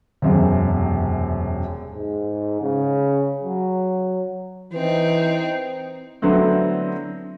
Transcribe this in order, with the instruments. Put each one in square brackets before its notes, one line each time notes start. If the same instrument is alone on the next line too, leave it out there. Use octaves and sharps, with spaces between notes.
[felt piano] E1 F#2 C3
[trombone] G#2
C#3
F#3
[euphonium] E3 [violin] C4 D#4
[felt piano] D3 F#3 A3 B3 C4 E4